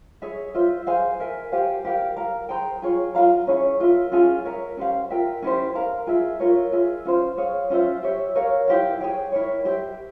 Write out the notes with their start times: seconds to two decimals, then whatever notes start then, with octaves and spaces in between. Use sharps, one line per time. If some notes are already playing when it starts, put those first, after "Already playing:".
0.22 G#4 C#5 E5
0.54 F4 C5 E5
0.87 G#4 C5 F5 G#5
1.20 A#4 E5 G#5
1.52 G4 C5 F5 G#5
1.85 G4 A#4 F5
2.17 A#4 F5 A#5
2.49 G#4 C5 G5 A#5
2.82 F4 G#4 C#5
3.15 F4 A#4 F5 A#5
3.47 C#4 E4 G#4 C#5
3.80 F4 A#4 E5
4.12 C#4 F4 G#4
4.45 A#4 C#5 E5 A#5
4.77 C#4 G4 C5 F5
5.10 F4 A#4 E5 G5
5.42 C#4 E4 G4 C5
5.75 A#4 F5 A#5
6.07 F4 G#4 E5
6.40 F4 A#4 C#5 E5
6.72 F4 G#4 E5
7.05 C#4 F4 C5
7.37 G#4 C#5 F5
7.70 C#4 F4 C5 E5
8.03 G4 C#5 E5
8.35 A#4 C#5 F5
8.67 E4 G4 C5 F5
9.01 G#4 C#5 G5
9.32 E4 A#4 C#5
9.65 G4 C5 E5 G5